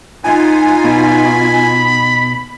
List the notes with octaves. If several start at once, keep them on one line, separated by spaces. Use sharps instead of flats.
B3 D#4 F4 G#5
B2 B5